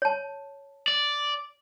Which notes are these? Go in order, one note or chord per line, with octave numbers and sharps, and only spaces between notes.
C#5 A5
D5